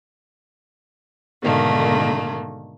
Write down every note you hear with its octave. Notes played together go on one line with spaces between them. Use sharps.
G#2 B2 D3 D#3 A3 A#3